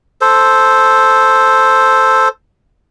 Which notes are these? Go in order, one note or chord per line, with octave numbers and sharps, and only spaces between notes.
A4 C5